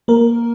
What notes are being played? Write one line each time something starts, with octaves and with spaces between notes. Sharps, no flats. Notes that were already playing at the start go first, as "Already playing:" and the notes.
A#3 A#4